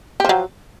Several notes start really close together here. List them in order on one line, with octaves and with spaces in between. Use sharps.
G4 F3 F#3